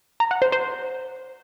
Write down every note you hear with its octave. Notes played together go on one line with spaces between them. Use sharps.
A#5
F#5
C5
C5